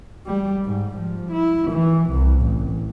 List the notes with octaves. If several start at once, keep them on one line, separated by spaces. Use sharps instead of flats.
G3
G#2
F3
E4
E3
C2
A1